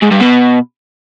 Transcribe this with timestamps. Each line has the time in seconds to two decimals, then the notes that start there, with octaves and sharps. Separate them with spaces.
0.03 G#2
0.11 G2
0.20 B2